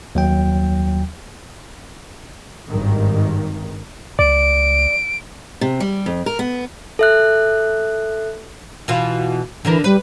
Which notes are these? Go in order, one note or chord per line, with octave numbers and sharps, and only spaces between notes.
D#2 F#3 G5
G#1 G2 D#3
C#2 D5 D7
C3
G3
F2
A#4
B3
A4 E5 F#6
B2 E3 F4
D3 E3 D4 A#4
G3 B4